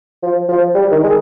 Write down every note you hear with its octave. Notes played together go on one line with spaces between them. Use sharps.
F3
F3
G3
D#3
G#3